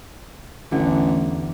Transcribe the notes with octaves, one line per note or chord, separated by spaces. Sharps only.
A1 E2 D3